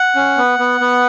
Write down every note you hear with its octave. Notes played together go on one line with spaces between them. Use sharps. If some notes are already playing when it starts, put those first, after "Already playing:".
Already playing: F#5
C#4
B3
B3
B3